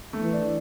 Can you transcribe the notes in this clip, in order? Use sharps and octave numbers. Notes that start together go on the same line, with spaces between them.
A3
E3
D4